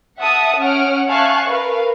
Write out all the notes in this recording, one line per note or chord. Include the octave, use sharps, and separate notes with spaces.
E5 F#5 A5 D#6
C#4 F#5 F6 D7
E5 F5 G#5 A5 C#6 F#6
A#4 B4 F5